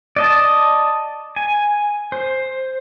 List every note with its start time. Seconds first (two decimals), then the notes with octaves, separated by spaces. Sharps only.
0.16 D5 D#5 A5
1.36 G#5
2.12 C5